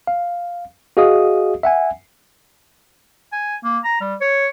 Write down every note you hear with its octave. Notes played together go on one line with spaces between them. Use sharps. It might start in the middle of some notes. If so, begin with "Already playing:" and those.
F5
F#4 G#4 D#5 F5 D#6
E5 F#5 G#5
G#5
A#3
A#5
G3
C#5